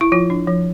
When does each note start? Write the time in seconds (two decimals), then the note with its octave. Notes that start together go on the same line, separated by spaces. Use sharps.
0.01 E4
0.12 F3 F4
0.30 D4
0.47 F3